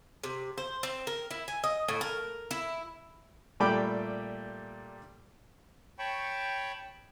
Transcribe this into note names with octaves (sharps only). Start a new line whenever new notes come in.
C3
C5
C4
A#4
E4
G#5
D#5
A2
A#4
E4
A#2 G3 A3 G5 B5 D6
C#5 G5 A5 B5 C#6